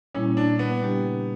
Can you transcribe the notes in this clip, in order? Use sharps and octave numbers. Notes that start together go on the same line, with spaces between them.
A#2 G3 A#3 C#4 E4
D4
B3
C#3 G3 A#3 D4 G4